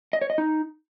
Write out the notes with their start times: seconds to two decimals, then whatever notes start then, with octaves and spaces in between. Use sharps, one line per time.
0.13 D#5
0.21 C#5
0.30 D#5
0.38 D#4